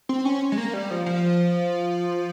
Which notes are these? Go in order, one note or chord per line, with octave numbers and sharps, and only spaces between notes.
C4
C#4
G#3
A#3
G3
F3
F3